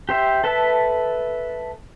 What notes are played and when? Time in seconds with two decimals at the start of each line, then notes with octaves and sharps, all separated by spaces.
0.09 G4 C5 E5
0.44 A4 B4 E5 A5